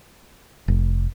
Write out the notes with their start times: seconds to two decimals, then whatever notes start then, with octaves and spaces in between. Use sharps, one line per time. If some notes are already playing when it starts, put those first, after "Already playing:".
0.68 F1